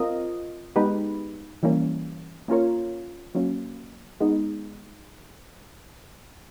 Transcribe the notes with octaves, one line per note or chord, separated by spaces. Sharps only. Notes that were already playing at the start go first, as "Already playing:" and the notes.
Already playing: C4 F4 A#4 D#5
G#3 B3 D#4 G4 B4
E3 G3 A#3 C#4
A#3 C#4 F4 A#4 C#5
F#3 A#3 C#4
G#3 B3 D#4